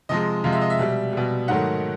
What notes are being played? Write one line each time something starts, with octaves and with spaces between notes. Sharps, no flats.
C3 F3 G#3 D#5
C3 F3 G#3 F5
E5
D#5
E5
B2 G3
B2 G3
G#2 D#3 F#3 A3 F#5